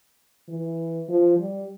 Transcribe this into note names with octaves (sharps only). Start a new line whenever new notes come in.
E3
F3
G3